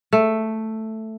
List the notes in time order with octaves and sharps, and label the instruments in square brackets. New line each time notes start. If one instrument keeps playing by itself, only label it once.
[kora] A3